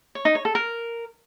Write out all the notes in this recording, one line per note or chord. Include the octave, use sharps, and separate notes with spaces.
C#5
D#4
C#5
A4
A#4